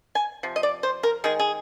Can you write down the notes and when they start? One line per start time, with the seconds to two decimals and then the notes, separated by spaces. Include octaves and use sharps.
0.15 G#5
0.43 C3 F3
0.56 D#5
0.63 D5
0.83 C5
1.03 A#4
1.24 D#3 G#3 G#4
1.39 G#4